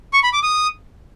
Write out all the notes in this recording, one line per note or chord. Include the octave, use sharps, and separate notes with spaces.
C#6
B5
D6
D#6